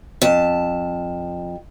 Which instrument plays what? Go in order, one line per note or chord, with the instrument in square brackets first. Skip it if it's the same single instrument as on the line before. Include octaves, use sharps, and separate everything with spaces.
[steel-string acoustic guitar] F2 A5